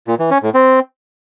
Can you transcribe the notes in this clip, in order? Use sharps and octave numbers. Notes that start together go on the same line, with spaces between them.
A#2
E3
C#4
A2
C4